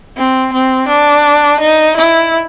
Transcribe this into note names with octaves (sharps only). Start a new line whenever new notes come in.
C4
C4
D4
D#4
E4